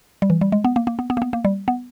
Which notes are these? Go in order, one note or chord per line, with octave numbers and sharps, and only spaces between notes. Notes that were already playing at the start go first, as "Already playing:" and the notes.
G3
E3
G3
G#3
B3
A#3
A#3
B3
B3
A#3
B3
A#3
G3
B3